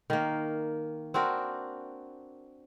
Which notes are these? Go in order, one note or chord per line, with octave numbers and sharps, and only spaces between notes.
D#3 A#3
C4 D4 F#4 A#4